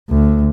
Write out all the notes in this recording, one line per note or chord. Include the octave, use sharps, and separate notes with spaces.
D2